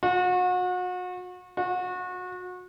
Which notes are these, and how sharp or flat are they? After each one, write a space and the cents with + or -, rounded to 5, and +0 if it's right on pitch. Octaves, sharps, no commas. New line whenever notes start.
F#4 -35
F#4 -30